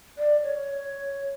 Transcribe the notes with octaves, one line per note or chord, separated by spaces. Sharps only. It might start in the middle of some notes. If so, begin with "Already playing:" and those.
D5
C#5